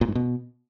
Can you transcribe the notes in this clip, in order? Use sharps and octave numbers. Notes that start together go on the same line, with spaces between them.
A#2
G#2
B2